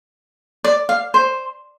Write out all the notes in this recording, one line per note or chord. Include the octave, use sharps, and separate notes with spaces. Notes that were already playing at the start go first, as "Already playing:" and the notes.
D5
F5
C5